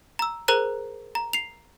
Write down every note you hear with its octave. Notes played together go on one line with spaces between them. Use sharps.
A#5 E6
G#4 A#4 C5 A#5 F#6 D#7
A#5
C7 F7